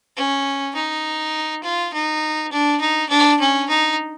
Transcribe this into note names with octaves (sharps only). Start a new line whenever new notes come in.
C#4
D#4
F4
D#4
D4
D#4
D4
C#4
D#4